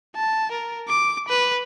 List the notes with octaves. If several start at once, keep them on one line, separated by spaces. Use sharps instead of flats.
A5
A#4
D6
B4